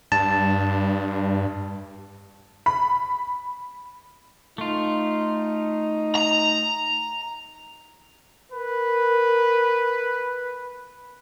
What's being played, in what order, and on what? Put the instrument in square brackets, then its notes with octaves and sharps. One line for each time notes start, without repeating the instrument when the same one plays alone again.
[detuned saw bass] G2 [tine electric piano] A5
[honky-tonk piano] B5
[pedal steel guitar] A3 F4 [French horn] D#4
[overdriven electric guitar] A#5
[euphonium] A#4 [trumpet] B4